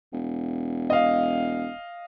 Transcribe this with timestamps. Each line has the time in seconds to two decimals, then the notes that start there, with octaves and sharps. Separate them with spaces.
0.13 E1
0.90 D#5 F5